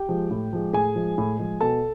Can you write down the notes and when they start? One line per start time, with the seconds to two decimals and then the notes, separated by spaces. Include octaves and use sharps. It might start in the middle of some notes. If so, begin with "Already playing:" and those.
Already playing: G4 G5
0.09 F3 G#3
0.31 A2
0.53 F3 G#3
0.73 A2 G#4 G#5
0.95 F3 G#3
1.18 A2
1.38 F3 G#3
1.60 B2 A4 A5